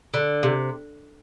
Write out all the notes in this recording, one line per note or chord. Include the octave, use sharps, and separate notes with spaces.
D3
C3